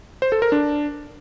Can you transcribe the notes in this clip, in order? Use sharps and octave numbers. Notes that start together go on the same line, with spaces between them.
C5
A4
A#4
D4